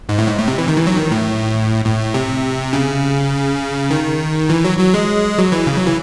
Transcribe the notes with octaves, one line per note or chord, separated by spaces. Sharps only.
G#2
A2
G#2
A2
C3
E3
D#3
E3
F#3
D#3
A2
A2
C3
C#3
D#3
E3
F#3
F#3
G#3
F#3
E3
C#3
F#3
E3